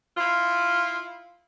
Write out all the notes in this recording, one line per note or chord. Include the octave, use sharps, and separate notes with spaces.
E4 F4